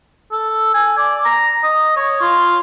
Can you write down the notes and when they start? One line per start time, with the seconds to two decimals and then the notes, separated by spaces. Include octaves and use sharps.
0.32 A4
0.74 G#5
0.98 D5
1.25 A#5
1.63 D#5
1.97 C#5
2.22 F4